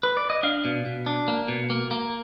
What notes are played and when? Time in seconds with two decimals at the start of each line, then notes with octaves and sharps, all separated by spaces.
0.03 B4
0.17 D5
0.30 D#5
0.43 D4 F5
0.65 B2
0.86 B2
1.06 D4
1.28 A#3
1.48 B2
1.70 A#3
1.91 A#3